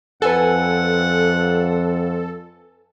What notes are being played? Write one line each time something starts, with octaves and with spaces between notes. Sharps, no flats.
F2 A4 B4 F#5 G#5